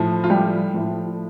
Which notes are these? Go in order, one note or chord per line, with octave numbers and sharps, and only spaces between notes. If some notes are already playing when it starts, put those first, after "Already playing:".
Already playing: A2 F3
F4
G3 G4
A2 F3